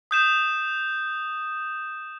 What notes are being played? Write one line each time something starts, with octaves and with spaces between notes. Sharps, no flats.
D#6 G6 E7